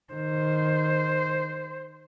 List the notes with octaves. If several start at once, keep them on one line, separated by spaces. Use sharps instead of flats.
D#3 C5